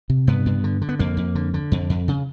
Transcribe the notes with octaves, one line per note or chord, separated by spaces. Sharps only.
C3
G2 B3
G2
D3
D3
B3
F2 A#3
F2
D3
D3
F2
F2
C#3